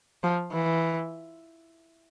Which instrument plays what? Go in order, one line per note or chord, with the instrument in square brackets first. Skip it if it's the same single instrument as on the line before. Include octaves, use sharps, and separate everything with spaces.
[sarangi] F3
E3